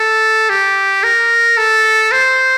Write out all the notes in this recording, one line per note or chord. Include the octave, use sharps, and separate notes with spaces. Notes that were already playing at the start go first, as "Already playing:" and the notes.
Already playing: A4
G4
A#4
A4
C5